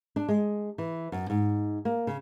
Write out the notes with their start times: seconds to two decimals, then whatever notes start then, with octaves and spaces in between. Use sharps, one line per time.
0.16 D4
0.28 G#3
0.78 E3
1.12 F#2
1.30 G#2
1.85 A#3
2.07 C#3